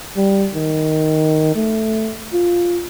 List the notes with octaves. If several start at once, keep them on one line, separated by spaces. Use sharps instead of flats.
G3
D#3
A3
F4